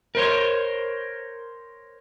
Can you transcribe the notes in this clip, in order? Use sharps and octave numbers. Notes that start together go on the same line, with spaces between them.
A#4 C5 C#5